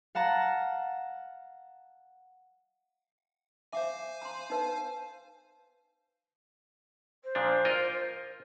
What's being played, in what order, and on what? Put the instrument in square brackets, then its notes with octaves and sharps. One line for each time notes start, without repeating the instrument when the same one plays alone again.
[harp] F5 F#5 A5 A#5
[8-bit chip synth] C5 F5 G#5 [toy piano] E5 D6
[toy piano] A#5 C6
D#4 B4
[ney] C5
[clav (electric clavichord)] A#2 F3 D4
F4 A#4 D#5